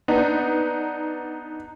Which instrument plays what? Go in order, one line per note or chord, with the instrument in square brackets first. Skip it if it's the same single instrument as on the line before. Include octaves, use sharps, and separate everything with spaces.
[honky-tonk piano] B3 D4 D#4